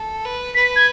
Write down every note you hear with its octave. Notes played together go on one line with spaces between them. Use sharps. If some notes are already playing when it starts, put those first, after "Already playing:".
Already playing: A4
B4
B4 B6
G#6